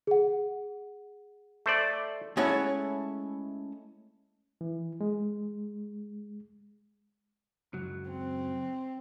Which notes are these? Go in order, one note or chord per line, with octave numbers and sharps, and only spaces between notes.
G#4 F#5
A3 C5 D5
G#3 A3 C#4 E4 C#5 F#5
E3
G#3
C#2 F#2 F#3
C4